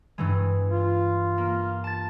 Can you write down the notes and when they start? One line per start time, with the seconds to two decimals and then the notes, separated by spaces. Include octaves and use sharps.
0.18 G2 E3 G#3
0.68 F4
1.38 A#3
1.84 A5 A6